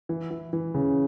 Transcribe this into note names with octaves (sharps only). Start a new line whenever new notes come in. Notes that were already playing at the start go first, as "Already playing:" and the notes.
E3
E3
E3
C#3